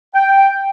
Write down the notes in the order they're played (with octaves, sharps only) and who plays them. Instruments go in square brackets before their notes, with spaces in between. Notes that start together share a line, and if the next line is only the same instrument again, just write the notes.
[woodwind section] G5